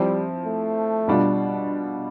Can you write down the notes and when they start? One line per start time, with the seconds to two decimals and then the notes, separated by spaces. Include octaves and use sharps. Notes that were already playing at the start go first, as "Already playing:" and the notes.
Already playing: F3 G3 C4 E4
0.45 A3
1.08 B2 G3 D4 F4